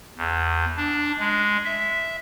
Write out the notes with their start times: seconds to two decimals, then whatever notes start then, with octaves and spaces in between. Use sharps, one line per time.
0.18 E2
0.77 D4
1.19 G#3
1.65 E5